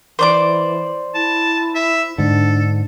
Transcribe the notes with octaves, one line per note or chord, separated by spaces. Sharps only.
E3 C5 D5 D6
E4 A5
E5
G#2 D3 D4 A4